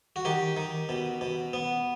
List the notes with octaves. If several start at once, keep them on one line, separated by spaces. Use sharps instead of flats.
F#4
D#3 G4
D#3
B2
B2
B3